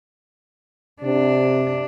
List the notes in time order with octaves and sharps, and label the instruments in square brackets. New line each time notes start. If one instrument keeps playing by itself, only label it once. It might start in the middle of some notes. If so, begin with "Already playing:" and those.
[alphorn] C3 [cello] D4